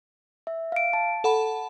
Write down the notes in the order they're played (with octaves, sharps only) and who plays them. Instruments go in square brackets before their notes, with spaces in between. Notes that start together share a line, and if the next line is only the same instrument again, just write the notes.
[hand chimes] E5
F5 D7
A5
[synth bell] A4 F#5 B5